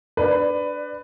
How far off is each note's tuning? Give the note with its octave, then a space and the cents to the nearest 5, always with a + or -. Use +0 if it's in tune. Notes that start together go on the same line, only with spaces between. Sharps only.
D4 +0 B4 +15 D5 +20